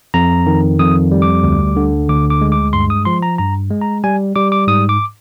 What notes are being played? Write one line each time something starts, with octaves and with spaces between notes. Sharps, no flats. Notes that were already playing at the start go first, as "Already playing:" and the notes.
F2 A#5
D#3
F2 D#6
G3
D6
D2
D3
D2 D6
D6
G#3
D6
G2 C6
D#6
F3 C6
A#5
G2 A#5
G#3
A#5
G3 G#5
G3 D6
D6
G#2 D#6
D6